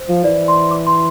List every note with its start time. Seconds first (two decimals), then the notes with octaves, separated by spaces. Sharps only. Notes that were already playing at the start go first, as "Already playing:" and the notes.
Already playing: C5
0.08 F3
0.24 E3 D5
0.48 C6
0.71 D6
0.87 C6